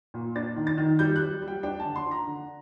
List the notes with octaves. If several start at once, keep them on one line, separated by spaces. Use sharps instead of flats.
A#2
D4 A6
D#3
A6
D#3
G3 G6
F#6
G3
G3
G5
D4 G5
A5
D3
C6
D4
A#5
D3